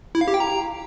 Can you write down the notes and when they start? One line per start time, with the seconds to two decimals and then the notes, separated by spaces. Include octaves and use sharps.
0.15 E4
0.21 F5
0.28 G4
0.34 G5
0.40 A#5